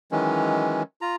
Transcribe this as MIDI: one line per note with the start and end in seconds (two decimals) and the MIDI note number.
0.12 0.83 51
0.12 0.83 52
0.12 0.83 54
0.12 0.83 56
0.12 0.83 61
1.01 1.16 65
1.01 1.16 82